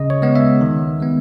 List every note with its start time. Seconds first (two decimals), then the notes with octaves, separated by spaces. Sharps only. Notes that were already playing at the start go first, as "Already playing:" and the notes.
Already playing: C#3 D#5
0.10 C#5
0.22 G#3 B3
0.35 E5
0.61 D#3
1.00 G#3 B3